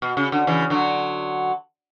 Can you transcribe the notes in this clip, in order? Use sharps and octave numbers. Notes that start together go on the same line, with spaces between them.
B2
C#3
D3
C#3 E3
D3 F#3